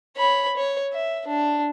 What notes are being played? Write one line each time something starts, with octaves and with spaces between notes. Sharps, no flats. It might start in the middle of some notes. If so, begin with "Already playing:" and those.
C#5 B5
C#5
E5
D4